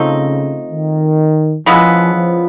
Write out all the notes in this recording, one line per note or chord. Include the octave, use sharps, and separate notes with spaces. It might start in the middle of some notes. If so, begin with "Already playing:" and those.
Already playing: C#3 F3 A3 C4 D#4
D#3
C#3 E3 F3 G#3 B3
F3